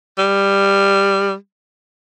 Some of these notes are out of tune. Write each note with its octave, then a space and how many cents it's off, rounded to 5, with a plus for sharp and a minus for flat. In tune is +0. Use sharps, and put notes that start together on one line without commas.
G3 +10